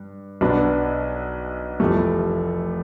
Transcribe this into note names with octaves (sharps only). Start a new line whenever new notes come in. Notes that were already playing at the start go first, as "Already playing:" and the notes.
Already playing: G2
B1 B2 B3 D4
F1 F2 C3 E3 A3